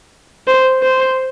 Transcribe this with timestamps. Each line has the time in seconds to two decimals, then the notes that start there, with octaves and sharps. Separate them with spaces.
0.48 C5
0.83 C5